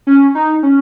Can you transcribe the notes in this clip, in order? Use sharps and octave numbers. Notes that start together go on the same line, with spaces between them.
C#4
D#4
C#4